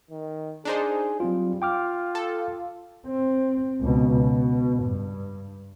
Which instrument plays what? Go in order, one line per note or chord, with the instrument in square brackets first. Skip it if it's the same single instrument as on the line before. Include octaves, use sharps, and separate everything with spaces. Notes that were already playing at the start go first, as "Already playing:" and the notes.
[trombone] D#3
[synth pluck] D4 D#4 C5 [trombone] G#4
[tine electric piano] F#3 C4 F4 [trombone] G3
[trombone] F4 [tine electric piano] G5 D6 F6
[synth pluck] A4
[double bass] C4
C#2 B2
B2
G2